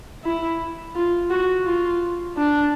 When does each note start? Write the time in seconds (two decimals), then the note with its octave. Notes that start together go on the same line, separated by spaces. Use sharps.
0.24 E4
0.95 F4
1.30 F#4
1.66 F4
2.37 D4